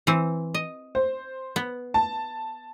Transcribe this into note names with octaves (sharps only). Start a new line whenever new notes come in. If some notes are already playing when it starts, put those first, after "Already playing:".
E3 C4
D#5
C5
B3
A5